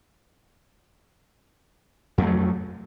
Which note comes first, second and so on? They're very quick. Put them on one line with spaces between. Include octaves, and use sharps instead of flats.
F2 A3 F#3